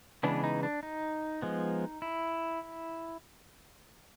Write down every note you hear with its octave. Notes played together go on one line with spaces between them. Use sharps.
C#3 E3 G#3 B3 D4
D#4
D4
D#4
F3 G#3 B3
E4